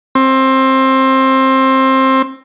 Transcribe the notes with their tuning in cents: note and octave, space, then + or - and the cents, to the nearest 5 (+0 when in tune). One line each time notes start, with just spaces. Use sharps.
C4 +20